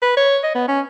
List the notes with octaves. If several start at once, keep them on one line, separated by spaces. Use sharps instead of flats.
B4
C#5
D#5
B3
C#4